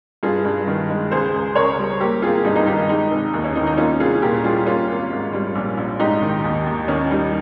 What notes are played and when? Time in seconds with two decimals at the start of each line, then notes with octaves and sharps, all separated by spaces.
0.23 G2 F4 G#4
0.45 G2
0.67 D#3
0.90 G#3
1.11 C#2 G#4 C5
1.34 C#2
1.56 C#3 A#4 C#5
1.78 G3
2.00 A#3 G4 A#4
2.22 G#1 F4 G#4
2.45 G2 D#4
2.56 D#4
2.66 D#3 D#4 G4
2.89 G#3 D#4
3.11 F1
3.33 D#2
3.44 C#4
3.55 D#3 D#4
3.67 D#4
3.78 A#3 C#4 F4
4.00 C2 F4 G#4
4.22 A#2 G4 A#4
4.44 G3 F4 G#4
4.66 A#3 C#4 F4
4.88 G#1
5.10 G#2
5.33 G3
5.55 A#1
5.77 A#1
5.99 G#2 D#4 G4
6.22 D#3
6.44 D#2
6.66 D#2
6.88 D#3 C#4
7.10 G3 D#4